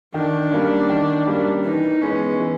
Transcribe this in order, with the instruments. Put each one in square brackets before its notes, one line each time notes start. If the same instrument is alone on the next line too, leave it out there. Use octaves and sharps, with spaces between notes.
[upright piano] D#3 [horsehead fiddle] D4
[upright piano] G3 A#3 C#4
D#3
G3 A#3 C#4
[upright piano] E3 [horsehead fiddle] D#4
[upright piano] G#3 B3 [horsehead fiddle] C#4
[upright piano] E3